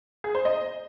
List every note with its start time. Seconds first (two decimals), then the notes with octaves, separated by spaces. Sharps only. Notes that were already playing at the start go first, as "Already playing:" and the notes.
0.24 G#4
0.35 C5
0.45 D#5